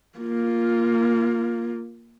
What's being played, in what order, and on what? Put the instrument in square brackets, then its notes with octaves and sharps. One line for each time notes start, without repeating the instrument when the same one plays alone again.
[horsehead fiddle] A#3 F4